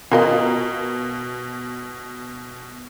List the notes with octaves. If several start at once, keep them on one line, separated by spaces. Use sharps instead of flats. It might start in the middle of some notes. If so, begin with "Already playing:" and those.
B2 F4 A#4 D#5